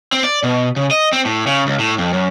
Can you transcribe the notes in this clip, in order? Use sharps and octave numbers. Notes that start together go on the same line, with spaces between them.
C4
D5
B2
C#3
D#5
C4
A2
C#3
C#2
A2
F2
F#2